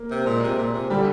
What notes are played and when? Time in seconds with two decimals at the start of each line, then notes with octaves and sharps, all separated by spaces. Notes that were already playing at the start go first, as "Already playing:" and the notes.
Already playing: A#3
0.11 C3
0.26 A#2 G#3
0.43 C3
0.58 A#2
0.74 C3
0.90 D3 G3